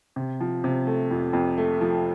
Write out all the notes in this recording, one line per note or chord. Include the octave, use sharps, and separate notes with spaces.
C3
F3
C3
A3
F2
F2
A3
F3